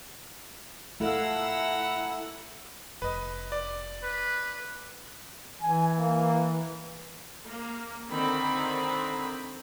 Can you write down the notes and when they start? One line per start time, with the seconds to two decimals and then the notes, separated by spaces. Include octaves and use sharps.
1.00 A3 E4 A4 F5 F#5 A#5 E6
3.02 F1 B4 D#5
3.52 D5
4.03 B4
5.63 E3 G#5
5.99 A#3
7.46 A#3
8.11 D3 D#3 C4 B5